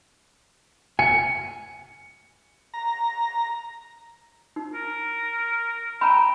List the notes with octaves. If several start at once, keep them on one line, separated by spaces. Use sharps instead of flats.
G#5 C#7
A#5
D#4
A#4
G5 A#5 B5